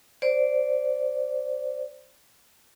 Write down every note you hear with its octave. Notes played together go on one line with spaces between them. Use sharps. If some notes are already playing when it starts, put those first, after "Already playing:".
C5 D5